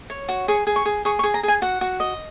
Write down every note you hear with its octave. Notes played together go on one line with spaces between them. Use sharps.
C#5
F#4
G#4 C#6
G#4
C#6
G#4
G#4 C#6
C#6
G#4
A#5
G#4 G#5
F#4 F#5
F#4
D#5